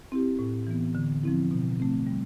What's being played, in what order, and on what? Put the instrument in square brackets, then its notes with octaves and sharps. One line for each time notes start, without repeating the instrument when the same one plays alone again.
[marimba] C4 E4 G4
A2
E3 B3
D3
F3 C4 E4
B2
A3 C4
G3